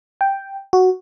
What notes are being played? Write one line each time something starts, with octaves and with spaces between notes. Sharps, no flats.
G5
F#4